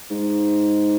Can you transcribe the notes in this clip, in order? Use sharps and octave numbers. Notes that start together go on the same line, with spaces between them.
G#2